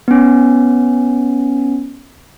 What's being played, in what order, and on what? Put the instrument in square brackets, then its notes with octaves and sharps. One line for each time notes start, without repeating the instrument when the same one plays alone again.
[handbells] B3 C#4